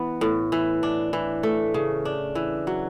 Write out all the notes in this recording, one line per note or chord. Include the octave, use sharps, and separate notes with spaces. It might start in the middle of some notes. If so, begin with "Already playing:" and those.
Already playing: E3 B3
A2
E3
D4
E3
A3
C#3
D4
E3
F#3